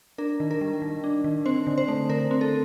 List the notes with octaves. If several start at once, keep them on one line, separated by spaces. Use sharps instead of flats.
D4 A#4
D#3
A#4
G3
D#3
D4
D#3
C4 C5
D3
C5
A3
D3 A#4
C4
A4